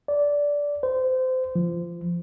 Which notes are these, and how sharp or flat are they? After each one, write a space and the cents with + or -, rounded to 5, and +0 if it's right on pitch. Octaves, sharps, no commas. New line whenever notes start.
D5 -15
C5 -25
F3 -20